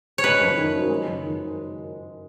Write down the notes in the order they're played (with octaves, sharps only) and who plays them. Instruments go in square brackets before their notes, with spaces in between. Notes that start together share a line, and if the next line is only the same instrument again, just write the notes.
[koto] C#5
[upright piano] G#3 [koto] B4
[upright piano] F#1
D#3
F#2
G#3
F#1
D#3